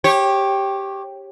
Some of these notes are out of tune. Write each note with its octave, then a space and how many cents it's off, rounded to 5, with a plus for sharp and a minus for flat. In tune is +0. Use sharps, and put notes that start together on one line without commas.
G4 +0 C#5 -25